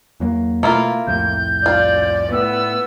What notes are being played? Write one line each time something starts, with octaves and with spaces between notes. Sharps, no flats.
E2 F#3 A#3
B2 A3 A#3 E4 F4
C2 F2 A2 G6
F4 D5
A2 B3 E6